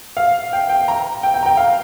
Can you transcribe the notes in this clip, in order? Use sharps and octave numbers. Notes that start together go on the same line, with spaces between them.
F5
G5
G5
A#5
G5
G5
A#5
G5
F5